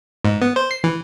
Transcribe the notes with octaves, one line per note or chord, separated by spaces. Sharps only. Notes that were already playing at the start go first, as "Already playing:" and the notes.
G#2
B3
C5
C7
E3